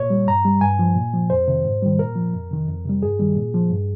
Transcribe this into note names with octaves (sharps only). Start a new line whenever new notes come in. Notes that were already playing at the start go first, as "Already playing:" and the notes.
Already playing: A#2 C#5
G3
G2 A#5
G3
G2 G#5
F3
A#2
F3
F2 C5
C3 D#3
G#2
D#3 G3
A#2 A#4
F3
F2
C3 D#3
F2
C3 G3
G2 G#4
D#3 G3
A#2
F3
G2